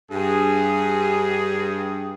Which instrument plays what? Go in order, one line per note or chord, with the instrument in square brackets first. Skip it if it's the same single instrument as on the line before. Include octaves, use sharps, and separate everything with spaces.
[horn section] G2 G#4